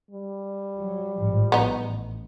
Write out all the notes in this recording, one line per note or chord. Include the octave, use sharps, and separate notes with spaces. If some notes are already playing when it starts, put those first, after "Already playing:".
G3
F#3
G#1 A2 F3
A#1 B3 D#4
A1